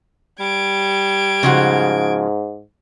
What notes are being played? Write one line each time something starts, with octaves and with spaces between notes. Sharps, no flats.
G3 G#6 D7
G#2 C#3 F3 F#4